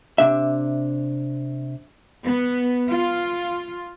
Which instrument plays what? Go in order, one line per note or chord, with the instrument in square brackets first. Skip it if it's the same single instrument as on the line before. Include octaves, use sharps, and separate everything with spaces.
[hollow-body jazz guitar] C3 D4 E5
[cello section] B3
F4